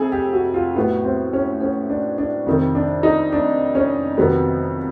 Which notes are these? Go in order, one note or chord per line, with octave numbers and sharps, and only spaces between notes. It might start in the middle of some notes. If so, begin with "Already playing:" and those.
Already playing: F2 C3 G#4 A4
G4
F#4
F4
A2 F#3 B3
C4
C#4
C#4
D4
D4
F2 C3 D#3
D4
D#4
D4
C#4
F2 C3 D#3 F#3 B3